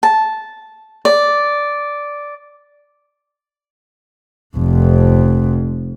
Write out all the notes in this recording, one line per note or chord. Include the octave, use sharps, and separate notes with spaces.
A5
D5
F1 F2